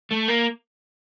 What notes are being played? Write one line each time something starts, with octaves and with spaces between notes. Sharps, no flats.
A3
A#3